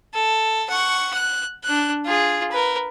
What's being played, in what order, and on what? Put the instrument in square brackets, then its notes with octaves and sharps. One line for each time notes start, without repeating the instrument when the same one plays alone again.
[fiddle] A4
F#5 C#6
F#6
D4 F#6
F4 G#4
A#4 B4